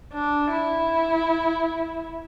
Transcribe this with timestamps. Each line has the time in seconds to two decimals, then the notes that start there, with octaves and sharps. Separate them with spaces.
0.14 D4
0.51 E4